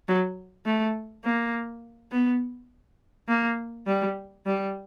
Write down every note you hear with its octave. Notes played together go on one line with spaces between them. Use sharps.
F#3
A3
A#3
B3
A#3
G3
G3